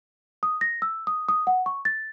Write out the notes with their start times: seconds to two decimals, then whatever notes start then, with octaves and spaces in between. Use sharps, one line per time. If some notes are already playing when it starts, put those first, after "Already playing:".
0.43 D#6
0.61 A#6
0.82 E6
1.07 D#6
1.29 D#6
1.47 F#5
1.66 C#6
1.85 A6